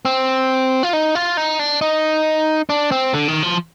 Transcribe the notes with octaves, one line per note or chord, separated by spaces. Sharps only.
C4
F4
D#4
F4
D#4
D4
D#4
D4
C4
D3
D#3
F3